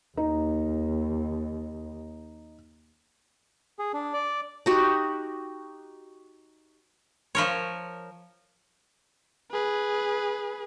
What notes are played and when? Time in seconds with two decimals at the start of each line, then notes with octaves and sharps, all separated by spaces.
0.17 D#2 D#4
3.79 G#4
3.94 D4
4.13 D5
4.66 D#4 F#4 G4
7.35 F3 A#4 C#5
9.51 G#4 B4